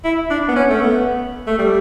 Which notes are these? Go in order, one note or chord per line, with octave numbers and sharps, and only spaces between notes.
E4
D4
B3
C#4
A3
B3
A3
G3